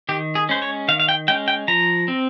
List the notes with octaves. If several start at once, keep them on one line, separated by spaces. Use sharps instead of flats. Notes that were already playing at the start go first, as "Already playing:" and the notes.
D#3 G4
G#4
G#3 C#4 C5
C#5
D#3 F5
F5
G5
G#3 C#4 G5
G5
F3 A#5
C4